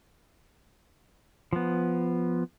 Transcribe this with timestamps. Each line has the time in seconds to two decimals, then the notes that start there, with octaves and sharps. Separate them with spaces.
1.53 F3 B3